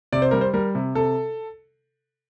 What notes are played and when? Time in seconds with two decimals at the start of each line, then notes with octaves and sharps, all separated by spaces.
0.13 C3 D5
0.22 C5
0.31 G3 A#4
0.41 C5
0.54 G3 A#4
0.75 C3
0.95 C3 A4